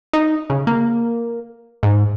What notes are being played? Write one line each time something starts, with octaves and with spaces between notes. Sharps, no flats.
D#4
C#3
A#3
G#2